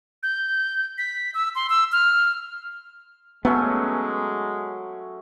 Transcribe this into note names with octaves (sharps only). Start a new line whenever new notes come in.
G6
B6
E6
C6
E6
F6
F#3 G#3 A3 B3 C#4